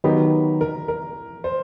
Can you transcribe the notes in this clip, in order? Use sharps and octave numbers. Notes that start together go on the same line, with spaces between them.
D#3 F#3 B3 G4
A#4
A#4
C5